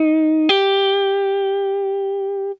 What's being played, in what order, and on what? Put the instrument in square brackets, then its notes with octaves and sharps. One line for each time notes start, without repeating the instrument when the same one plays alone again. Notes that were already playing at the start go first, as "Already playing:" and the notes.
Already playing: [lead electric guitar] D#4
G4